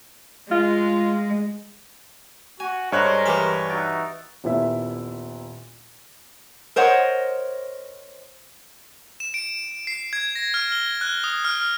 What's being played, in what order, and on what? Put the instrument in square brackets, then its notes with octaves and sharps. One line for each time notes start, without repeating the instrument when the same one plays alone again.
[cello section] G#3 [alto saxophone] F4
[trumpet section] F#4 [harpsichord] G#5
[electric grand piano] G2 C#5 F#6 [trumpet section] G#3 A#4 C5 [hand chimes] D#5
[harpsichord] E3 G4 B5 [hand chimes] G#5 C#6 D6
[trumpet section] D#4 F#4 E5 [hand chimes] A6 D7
[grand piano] D#1 A#2 B3 E4 E5
[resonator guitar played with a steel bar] A#4 C5 C#5 D#5 F#5
[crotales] E7
D7
C7
G#6
A#6
F6
G7
F#6
D#6
F6